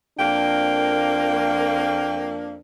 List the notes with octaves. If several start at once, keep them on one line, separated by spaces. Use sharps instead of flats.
F2 A#3 D4 G5